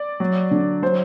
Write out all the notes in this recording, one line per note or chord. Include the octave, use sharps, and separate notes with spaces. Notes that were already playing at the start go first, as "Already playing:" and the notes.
Already playing: D5
F#3
D3
F#3 C5